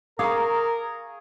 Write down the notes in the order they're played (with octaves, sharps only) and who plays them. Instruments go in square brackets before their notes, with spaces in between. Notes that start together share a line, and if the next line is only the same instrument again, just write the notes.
[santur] G#4 C#6 [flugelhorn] A#4 [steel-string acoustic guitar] F5 [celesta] A#5 D6